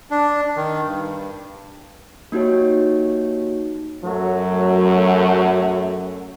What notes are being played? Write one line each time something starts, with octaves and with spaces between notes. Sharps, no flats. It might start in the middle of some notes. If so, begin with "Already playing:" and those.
D4
D#3
G2
A#3 D#4 F#4 G4 C#5
F#2 F#3 A3